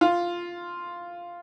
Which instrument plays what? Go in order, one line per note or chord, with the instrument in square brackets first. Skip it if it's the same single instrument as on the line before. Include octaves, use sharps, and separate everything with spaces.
[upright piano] F4